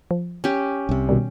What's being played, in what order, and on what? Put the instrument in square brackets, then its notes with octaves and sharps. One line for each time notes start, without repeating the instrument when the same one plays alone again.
[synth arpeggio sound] F3
[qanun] C#4 G4
[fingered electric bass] C2 C3
[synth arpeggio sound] B2 D#3 G3